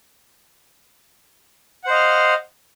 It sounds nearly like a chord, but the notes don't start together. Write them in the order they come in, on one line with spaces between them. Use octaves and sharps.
F#5 C5 D#5 F5